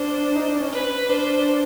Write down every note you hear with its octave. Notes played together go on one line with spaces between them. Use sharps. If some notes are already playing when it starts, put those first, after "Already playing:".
Already playing: D4 C5
D#4
D4
C#4
B4
D4 C5